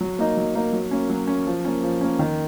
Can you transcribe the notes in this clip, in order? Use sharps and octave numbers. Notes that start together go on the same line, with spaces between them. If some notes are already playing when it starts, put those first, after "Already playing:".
F#3
A#3 D#4
F#3
A#3 D#4
F#3
A#3 C#4
F#3
A#3 C#4
F3
A#3 C#4
F3
A#3 C#4
D#3